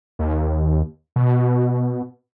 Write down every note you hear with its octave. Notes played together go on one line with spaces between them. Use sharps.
D#2
B2